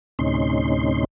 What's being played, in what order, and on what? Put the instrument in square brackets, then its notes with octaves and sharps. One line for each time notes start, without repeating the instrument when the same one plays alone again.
[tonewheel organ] D2 A2 C3 C#4 D#4 C6